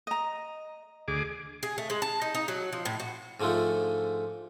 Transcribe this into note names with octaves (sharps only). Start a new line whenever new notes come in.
D#5 A#5
D2 G#4 D6
G#4
A3
G#3
A5
D#4
D#4
F#3
F3
A2
F#4
G#2 D3 F3 G#3 A3